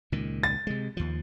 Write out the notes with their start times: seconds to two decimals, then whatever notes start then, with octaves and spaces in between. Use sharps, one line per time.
0.12 C#2 A#2 D#3
0.43 A6
0.67 C3 G#3
0.97 D#2 F3